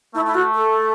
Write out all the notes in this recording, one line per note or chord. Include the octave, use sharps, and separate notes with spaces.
A3 E4
E4
F#4
A4